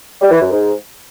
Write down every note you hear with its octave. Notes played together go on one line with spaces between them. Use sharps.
G3
E3
F#2
G#2